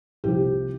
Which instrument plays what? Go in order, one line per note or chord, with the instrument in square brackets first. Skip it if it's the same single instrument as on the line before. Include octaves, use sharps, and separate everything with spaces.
[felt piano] C2 C3 F3 G4